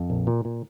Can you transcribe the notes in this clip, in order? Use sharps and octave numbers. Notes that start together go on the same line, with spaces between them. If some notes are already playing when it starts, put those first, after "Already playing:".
Already playing: F2
A#1
A#2
A#2